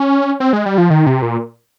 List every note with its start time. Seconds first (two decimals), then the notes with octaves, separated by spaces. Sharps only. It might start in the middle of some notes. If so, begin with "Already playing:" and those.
Already playing: C#4
0.40 C4
0.53 G#3
0.66 G3
0.78 F3
0.90 D#3
1.06 C3
1.22 A#2